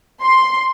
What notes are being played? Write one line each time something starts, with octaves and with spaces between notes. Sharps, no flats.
C6